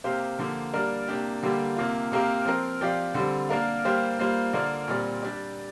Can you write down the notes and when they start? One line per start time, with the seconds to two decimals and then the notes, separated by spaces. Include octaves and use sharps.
0.04 C3 A#3 G4 C5 F5
0.39 D3 F3 A#3 G4
0.74 G3 A#3 D4 A#4 D5
1.08 C3 A#3 D4 G4
1.43 D3 G3 A#3 G4
1.76 C3 A#3 F4
2.12 C3 A#3 G4 A#4 F5
2.45 F3 C4 A#4
2.81 F3 C4 G4 D5 F5
3.14 D3 G3 C4
3.49 A#3 D4 A#4 F5
3.85 G3 A#3 G4 C5 F5
4.19 G3 A#3 F4 C5 F5
4.53 D3 A#3 F4 A#4 D5
4.87 A#2 G3 C4 A#4 D5
5.23 G3 D4 G4 D5